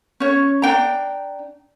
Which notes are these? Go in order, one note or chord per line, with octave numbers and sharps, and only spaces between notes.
C#4 C#5
D4 G5 A#5